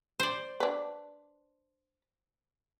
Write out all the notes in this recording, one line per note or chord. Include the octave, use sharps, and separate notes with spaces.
C5 D5
D4 B4